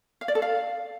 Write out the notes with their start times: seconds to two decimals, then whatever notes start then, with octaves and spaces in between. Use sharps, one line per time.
0.21 F5
0.28 D5
0.35 A4
0.42 F5